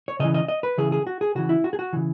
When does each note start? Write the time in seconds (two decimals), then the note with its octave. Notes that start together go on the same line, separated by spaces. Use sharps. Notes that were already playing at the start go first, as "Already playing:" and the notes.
0.08 C#5
0.20 C#3 E3 D#5
0.34 D#5
0.48 D#5
0.63 B4
0.78 C#3 E3 G#4
0.92 G#4
1.07 F#4
1.21 G#4
1.35 C#3 E3 F#4
1.49 E4
1.64 F#4
1.73 G#4
1.79 F#4
1.93 C#3 E3